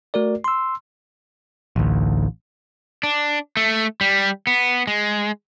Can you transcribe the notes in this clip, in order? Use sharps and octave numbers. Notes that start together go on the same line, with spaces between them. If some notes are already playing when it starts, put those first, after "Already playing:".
A3 F#4 A#4 D5
C6 E6
A1 D2
D4
A3
G3
B3
G#3